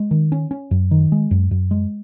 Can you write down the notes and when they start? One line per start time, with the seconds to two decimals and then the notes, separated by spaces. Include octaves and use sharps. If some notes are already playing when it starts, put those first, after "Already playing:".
Already playing: G#3
0.11 D#3
0.32 C#4
0.51 C#4
0.71 F#2
0.91 D#3
1.12 G#3
1.31 F#2
1.51 F#2
1.71 G#3